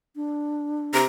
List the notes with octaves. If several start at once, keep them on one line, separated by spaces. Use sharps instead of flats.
D4
C3 A#5